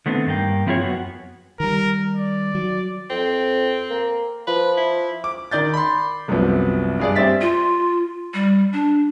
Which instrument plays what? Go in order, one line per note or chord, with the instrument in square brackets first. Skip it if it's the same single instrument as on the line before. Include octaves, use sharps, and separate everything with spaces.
[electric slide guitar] D3 D#3 A3 B3 C4
G2 A#3 G5
F3 C4 E4 F4 G#4 C#5
F#2 B3 F#4
[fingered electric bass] D#3 G3 [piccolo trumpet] A#4
[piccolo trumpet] D5
[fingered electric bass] F#3
[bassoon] F2 [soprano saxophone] C4
[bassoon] A#3
[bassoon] F3 [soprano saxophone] B4
[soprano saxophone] E4
[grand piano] D6
D#3 D5 G6 A6
B5 C6
C2 F#2 F3 B3
G2 G#4 D5
G3 C4 D5 E5 A6 B6
[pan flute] F4
G3
D4